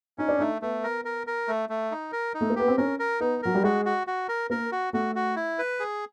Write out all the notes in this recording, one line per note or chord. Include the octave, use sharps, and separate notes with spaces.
C#4 D#4
D4
A3 D#4
A3 B3
A#4
A#4
A#4
A3
A3
D#4
A#4
D#4
A3
A#3
B3 G4
C4
C#4 A#4
A#4
B3 D#4
F#3 A#4
G3
G#3 F#4
F#4
F#4
A#4
A#3 A#4
F#4
A3 F#4
F#4
E4
B4
G#4